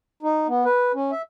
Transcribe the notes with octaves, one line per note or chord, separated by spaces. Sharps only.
D#4
B3
B4
C#4
E5